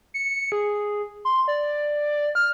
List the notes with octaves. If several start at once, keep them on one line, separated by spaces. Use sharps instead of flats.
C#7
G#4
C6
D5
F6